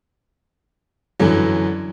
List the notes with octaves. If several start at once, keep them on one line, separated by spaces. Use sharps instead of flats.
F#2 D3 E3 F#3